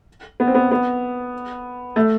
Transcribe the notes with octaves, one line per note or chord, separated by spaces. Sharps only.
B3
C4
B3
B3
A3